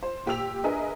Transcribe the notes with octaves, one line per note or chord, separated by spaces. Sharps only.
C5
A#2 G4 G5 E6 F7
D4 G#4 A#4 B4 D#5 E5